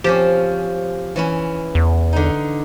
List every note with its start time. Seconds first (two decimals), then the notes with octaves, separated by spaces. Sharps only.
0.04 F3 C4 C#4 G4
1.16 E3 C#4 E4
1.75 E2
2.13 D3 D#4